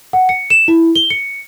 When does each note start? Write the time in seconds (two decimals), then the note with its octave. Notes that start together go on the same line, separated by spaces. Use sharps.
0.13 F#5
0.29 C#7
0.50 E7
0.68 E4
0.95 G7
1.10 C#7